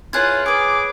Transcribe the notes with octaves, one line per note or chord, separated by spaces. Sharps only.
E4 F4 G#4 B4 C#5 F#6 G#6
G#4 B4 G#5 D6